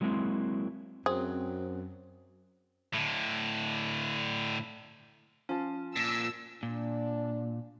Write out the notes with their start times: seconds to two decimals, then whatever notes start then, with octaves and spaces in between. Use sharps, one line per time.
0.01 F#3 G#3 A#3 C4 E4
1.06 F#2 C4 G#4
2.94 A2 D3
5.49 F3 C#4 A5
5.96 A#2 E6
6.63 A#2 D4